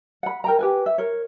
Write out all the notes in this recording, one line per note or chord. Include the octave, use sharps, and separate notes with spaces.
F#5 B5
A#4 G5 A#5
G4 B4 G#5
E5
A#4 C#5